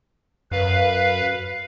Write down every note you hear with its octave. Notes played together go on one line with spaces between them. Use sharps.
F#2 B4 F5